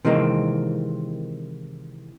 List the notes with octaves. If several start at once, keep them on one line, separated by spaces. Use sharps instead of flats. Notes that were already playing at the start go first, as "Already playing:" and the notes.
C3 D#3 E3 G#3 A#3 C4